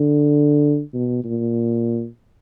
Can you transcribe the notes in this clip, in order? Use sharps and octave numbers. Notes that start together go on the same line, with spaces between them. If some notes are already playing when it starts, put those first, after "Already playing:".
Already playing: D3
B2
A#2